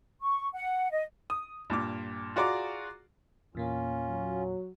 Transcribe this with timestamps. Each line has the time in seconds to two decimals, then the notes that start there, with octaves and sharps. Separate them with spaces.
0.21 C#6
0.53 F#5
0.91 D#5
1.30 D#6
1.70 G2 A#2 D6
2.36 F4 F#4 G#4 D5 A#5 D6
3.55 E2 A#2 A#3 C#4 F4
4.09 F#3